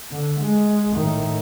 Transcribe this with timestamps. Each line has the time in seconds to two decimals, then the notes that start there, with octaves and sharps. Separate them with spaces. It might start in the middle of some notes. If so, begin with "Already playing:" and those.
0.11 D3
0.40 G#3
0.96 A2 D#3